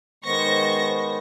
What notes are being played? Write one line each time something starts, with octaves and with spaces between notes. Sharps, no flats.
D#3 G#3 B3 C5 C#6 A#6